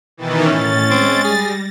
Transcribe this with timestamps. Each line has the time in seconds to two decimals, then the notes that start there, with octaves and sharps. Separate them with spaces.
0.17 B2 D#3 E3 A6
0.46 A2 C#4 A6
0.90 G#3 C4
1.24 G3 G#4 A#6